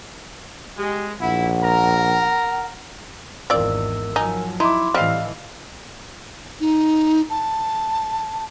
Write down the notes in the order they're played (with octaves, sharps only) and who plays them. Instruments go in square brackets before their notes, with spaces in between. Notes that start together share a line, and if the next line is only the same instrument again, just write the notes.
[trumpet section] G#3 [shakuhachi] G4
[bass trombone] A#1 [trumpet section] E4 [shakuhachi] F#5
[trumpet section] A#4 A#5
[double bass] G#1 E2 [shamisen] C4 F4 D5 [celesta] A#4 E6
[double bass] F3 F#3 [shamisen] D#4 [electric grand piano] G#5
[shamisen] D#4 [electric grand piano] E4 [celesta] C6 D6
[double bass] A2 E3 [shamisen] G3 C4 [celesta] D#5 [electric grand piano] F5 F6
[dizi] D#4
A5